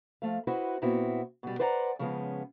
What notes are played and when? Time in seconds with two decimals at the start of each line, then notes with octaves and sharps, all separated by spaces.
0.22 F3 A3 F5
0.47 E4 F#4 B4 C5 D#5
0.82 A#2 B3 C4 E4 F#4
1.43 B2 G3
1.59 B4 C5 D5 F#5 G5 A#5
1.99 C#3 F3 G#3 B3 C#4